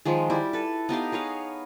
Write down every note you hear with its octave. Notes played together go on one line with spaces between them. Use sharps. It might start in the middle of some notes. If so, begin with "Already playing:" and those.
D#3 F3 G#3
G3 E4
A4 B4
B3 D#4 G4 F5
G#4 B4 C#5 F5